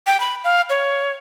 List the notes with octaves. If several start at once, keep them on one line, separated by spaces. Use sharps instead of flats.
G5
B5
F5
C#5